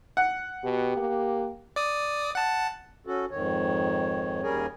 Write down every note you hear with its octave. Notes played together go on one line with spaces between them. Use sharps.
F#5
B2 G4
A#3
D5 D#6
F#5 A5
C#4 F#4 A4
F2 G#2 D#3 C#5
D#2 G3 C#4 G#4 A#4 C#5